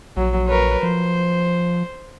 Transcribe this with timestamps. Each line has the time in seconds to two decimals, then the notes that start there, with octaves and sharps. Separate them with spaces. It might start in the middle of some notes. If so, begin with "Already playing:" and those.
0.17 A#1 F#3
0.47 A#4 B4 C#5
0.83 F3 C5